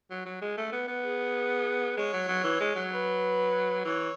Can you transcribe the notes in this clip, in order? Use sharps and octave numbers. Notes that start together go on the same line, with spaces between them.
F#3
F#3
G#3
A3
B3
B3
G#4
G#3 C#5
F#3
F#3
E3
G#3
F#3
B4
E3 C#5